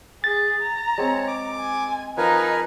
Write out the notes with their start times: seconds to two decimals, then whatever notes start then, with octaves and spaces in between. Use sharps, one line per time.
0.24 G#4 A6
0.62 A#5
0.98 G#3 C4 C#5
1.28 D6
1.60 G#5
2.17 F3 D#4 A#4 B4 G#5